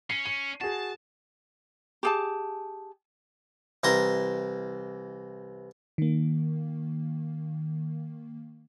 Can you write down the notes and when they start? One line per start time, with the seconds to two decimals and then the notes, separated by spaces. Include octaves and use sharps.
0.10 C#4 C7
0.25 D#7
0.61 F#4 G#4 A5
2.03 G4 G#4 A5
3.84 C2 E3 A#5 C6
5.98 D#3 A#3